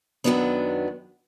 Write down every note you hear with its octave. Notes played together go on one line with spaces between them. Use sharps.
F#2 D#3 F#3 B3 D4